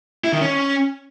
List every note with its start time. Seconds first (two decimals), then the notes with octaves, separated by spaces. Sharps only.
0.24 E4
0.33 D#3
0.41 C#4